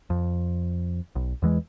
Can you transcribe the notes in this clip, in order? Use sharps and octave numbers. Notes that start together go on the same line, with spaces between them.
F2
B1
E2 E3 G#3